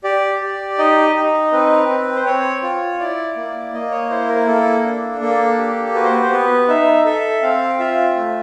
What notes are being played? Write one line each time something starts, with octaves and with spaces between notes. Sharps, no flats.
G4 D5
G4
D#4 D#5
D#4
C4 B4
C4
C5
C4 C#5
F4
E4 D5
A#3
A#3 D#5
C#5
E4 C5
A#4
A#3 A4
D4
A#3 A4
G4
F#4 B4
C5
B4
C5
B3 B4
D#4 E5
A4 E5
C4 F5
F4 E5
A3